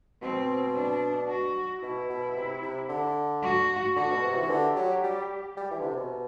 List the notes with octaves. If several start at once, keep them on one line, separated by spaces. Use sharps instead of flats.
B2 C4
D4
F#4
B2 E4
B2
C3
C3
D3
F#4
D3 F#4
B2
C3
E3
D3 G4
F#3
G3
G3
E3
D3
C3
B2